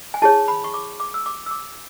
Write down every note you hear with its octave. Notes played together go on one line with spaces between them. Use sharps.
G#5
E4 G#4 C#5 A5
B5
C#6
D6
D6
E6
D6
E6
D6